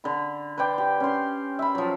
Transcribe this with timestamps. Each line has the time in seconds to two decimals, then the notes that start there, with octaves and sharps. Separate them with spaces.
0.04 D3 B5
0.58 B4 C5 D5 G5
0.78 G4
1.00 C#4 C6
1.59 E5 B5
1.75 F3 F#3